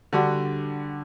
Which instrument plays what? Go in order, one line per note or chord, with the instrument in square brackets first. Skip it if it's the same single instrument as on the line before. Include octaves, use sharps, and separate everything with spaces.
[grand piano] D3 G3 D4 F#4